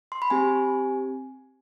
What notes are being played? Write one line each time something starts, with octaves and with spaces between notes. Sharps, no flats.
C6
B5
C4 G4 G#5